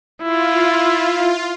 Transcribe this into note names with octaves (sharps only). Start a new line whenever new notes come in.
E4 F4